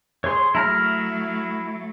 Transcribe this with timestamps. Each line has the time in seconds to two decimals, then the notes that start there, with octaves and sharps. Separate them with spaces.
0.24 G#4 C#5 C6
0.55 F#3 A3 E4 A#5 F6